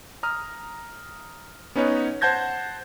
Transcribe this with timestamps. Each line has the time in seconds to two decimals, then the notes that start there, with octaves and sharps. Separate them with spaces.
0.23 A#5 D#6 F6
1.76 B3 C#4 D#4 B4 C#5
2.21 C5 F#5 A5 G6 G#6 A#6